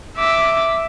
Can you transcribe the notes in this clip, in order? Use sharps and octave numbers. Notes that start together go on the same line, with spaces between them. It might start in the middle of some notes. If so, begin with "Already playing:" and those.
E5 D6